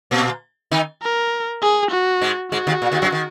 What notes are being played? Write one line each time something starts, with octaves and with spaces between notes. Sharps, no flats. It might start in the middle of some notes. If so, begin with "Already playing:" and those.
A#2 A#3
D#3 D#4
A#4
G#4
F#4
G#2 G#3
G#2 G#3 F#4
D#2 D#3
A#2
D#2 D#3
F#2 F#3
D#3